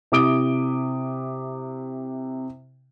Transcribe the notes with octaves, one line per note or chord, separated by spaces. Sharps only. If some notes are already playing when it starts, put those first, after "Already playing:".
C3 E4 D6 D#6 D7 G7